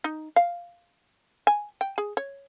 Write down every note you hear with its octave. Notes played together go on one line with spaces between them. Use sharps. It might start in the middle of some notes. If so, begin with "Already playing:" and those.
D#4
F5
G#5
G5
G#4
C#5